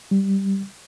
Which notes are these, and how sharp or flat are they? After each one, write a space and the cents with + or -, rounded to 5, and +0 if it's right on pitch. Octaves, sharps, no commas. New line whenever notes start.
G3 -5